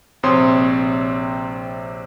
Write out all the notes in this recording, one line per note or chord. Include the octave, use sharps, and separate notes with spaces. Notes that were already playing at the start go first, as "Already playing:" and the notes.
A#1 C3 C4 C#5 C6 D#6